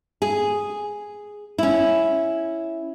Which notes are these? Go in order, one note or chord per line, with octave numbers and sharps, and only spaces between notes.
G#4
C#4 E4